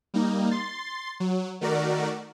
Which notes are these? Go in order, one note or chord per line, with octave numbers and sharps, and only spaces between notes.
G3 A#3 D#4
C6 A6
F#3
D#3 A3 F#4 A#4 D5